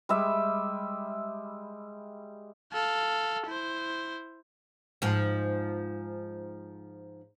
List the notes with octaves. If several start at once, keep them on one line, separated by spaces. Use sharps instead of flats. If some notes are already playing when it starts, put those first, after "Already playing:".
G3 G#3 E5
A4 F5
E4 C5
G#2 F3